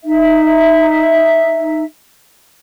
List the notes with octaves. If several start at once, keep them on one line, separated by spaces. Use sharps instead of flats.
D#4 E5